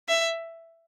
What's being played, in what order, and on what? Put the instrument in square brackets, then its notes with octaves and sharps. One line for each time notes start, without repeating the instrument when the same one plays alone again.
[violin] E5